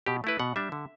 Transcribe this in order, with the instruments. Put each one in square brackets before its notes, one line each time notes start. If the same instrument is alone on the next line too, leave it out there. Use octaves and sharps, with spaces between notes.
[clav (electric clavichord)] B2 G4
A3 E4 B4
B2 F#5
G3 D4 E5
D3